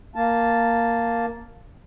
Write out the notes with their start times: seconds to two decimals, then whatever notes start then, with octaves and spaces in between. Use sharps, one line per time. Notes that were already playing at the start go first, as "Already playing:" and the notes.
0.16 A#3 A5